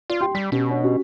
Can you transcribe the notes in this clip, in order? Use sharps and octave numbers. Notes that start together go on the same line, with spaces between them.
F4 D5
G4 G5 C6
G3 B6
B2 C#4 G4
D4 C#5
C#4 F#4 G4